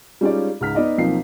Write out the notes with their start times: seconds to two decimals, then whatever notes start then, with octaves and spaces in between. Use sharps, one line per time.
0.21 G3 G#3 C#4 D#4 F4 D5
0.61 C#2 G#2 F6 B6
0.75 B3 D#4 D5 D#5
0.98 B1 F3 A#3 C4 D#4 C7